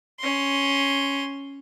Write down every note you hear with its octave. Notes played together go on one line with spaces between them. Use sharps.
C#4 C6